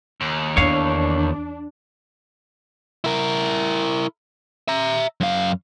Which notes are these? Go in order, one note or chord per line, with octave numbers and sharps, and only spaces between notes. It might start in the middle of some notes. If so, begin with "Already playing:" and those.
D#2
E2 D4 C#5 F5
E4 A#4
E5 A#5
F#2 F5